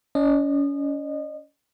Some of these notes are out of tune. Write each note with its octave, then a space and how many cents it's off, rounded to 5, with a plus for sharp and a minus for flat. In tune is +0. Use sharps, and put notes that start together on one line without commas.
C#4 +30 D#5 -30